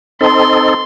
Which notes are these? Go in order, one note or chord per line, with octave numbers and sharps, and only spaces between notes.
C4 D#4 A4 C6